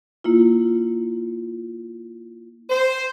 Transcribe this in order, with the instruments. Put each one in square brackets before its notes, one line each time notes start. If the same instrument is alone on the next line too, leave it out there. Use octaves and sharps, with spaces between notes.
[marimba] A#3 E4 F4
[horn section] C5